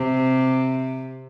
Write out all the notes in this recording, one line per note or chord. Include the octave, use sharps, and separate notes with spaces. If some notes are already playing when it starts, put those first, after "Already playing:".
Already playing: C3